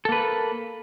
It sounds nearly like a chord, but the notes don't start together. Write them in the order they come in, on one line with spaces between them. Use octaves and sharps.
A4 A#3 B4